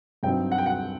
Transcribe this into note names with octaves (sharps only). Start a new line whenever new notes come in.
G2 F#3 C4 D#4 G5
F#5
G5
F#5